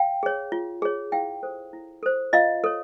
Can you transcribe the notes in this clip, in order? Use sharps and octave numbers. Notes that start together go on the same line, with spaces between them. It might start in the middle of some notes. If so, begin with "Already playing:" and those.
Already playing: F5 G5
G#4 C#5
F4
G#4 C#5
E4 F5 G5
A4 C5
E4
A4 C5
F4 D#5 F5
A4 C#5